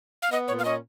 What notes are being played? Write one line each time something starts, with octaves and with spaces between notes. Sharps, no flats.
F5
B3 D#5
A#2 C#5
F5
C#4 D#5